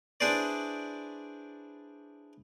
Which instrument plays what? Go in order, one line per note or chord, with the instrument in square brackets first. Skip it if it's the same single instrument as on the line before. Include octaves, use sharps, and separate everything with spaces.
[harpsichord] D4 E4 G#4 B4 C5 D5